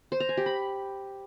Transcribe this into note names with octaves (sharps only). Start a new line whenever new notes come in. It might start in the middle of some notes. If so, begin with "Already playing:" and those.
C5
A#5
G#5
G4
B5